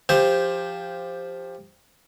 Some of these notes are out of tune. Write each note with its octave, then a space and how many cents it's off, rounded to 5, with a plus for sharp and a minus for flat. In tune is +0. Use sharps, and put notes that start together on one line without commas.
F3 +0 G4 +15 C5 +0